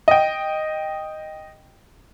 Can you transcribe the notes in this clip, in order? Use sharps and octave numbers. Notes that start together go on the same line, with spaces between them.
D#5 G5